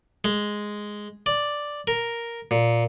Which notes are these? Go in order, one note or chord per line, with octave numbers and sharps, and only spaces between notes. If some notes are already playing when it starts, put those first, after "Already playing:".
G#3
D5
A#4
A#2